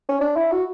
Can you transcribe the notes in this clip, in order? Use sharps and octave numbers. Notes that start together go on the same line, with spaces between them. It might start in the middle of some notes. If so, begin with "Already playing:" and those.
C#4
D4
E4
F#4